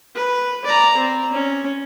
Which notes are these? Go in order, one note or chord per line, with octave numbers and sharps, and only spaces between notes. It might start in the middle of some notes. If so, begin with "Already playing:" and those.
B4
D5 A#5
C4
C#4